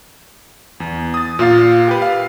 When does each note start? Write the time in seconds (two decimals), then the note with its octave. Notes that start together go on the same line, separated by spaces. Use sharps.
0.80 E2
1.14 D#6 A6
1.39 A#2 F4 F5 A6
1.88 G4 B4
2.02 F5